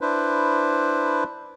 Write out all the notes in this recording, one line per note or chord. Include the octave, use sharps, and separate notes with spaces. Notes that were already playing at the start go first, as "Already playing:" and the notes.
D4 E4 B4 C5